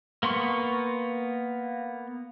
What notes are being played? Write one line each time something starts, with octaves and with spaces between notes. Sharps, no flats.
A#3 B3 C6 C#6